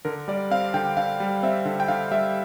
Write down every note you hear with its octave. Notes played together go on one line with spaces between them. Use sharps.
D3 A#4
G3 D5
C4 F5
D3 G5
D3 F5
G3
C4 E5
D3
G5
D3 F5
G3 E5